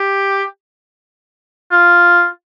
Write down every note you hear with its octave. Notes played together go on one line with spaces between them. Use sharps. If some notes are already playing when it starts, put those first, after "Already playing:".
Already playing: G4
F4